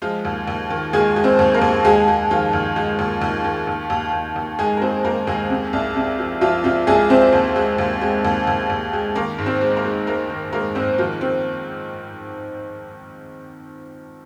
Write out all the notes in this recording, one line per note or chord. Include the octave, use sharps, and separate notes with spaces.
F3 G#3 F4
D#2
D#2
D#3
D#2 G#3 G#4
G#3
C4 C5
D#2
A#3 A#4
D#2
D#2 G#3 G#4
G#3
D#3 F3 F4
D#2
G#3
D#2
D#2
D#3
D#2
D#2
D#2
D#2
G#3 G#4
A#4
G#3 C4 C5
G#3 A#3 A#4
D#2 G#3 G#4
C3
C2
C3
F3
C2 F3 F4
C3 F3 F4
C2 G#3 G#4
C3 C4 C5
D#2
G#3
D#2
G#3
D#2
D#2
D#2
G#3
D#3 A#3 A#4
G#2
C4 C5
G#3
A#3 A#4
G#3
G#3 A#3 A#4
D#3
G#3 A#3 A#4
G#2 C4 C5
D#3 F3 F4
D#3 C4